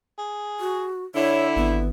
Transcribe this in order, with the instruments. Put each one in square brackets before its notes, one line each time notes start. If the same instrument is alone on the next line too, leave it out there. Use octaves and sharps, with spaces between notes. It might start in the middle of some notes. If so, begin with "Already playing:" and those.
[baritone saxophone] G#4
[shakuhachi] F#4
[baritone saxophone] D3 [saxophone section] E4 [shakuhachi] C#5
[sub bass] G#1 [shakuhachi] B3